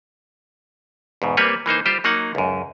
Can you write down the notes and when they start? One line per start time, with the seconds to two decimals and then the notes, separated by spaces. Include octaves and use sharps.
1.22 E2 G#2 B2
1.37 G3 A#3 C4 B4 C#5
1.66 E3 A#3 D#4 C5
1.86 G3 F4 G4 C5
2.04 F#3 A#3 D#4 F#5
2.35 C#2 F#2